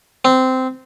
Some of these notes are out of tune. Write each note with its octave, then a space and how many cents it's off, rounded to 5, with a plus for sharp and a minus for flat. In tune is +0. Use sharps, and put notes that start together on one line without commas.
C4 -15